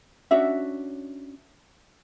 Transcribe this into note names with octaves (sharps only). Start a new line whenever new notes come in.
C#4 D4 F#4 E5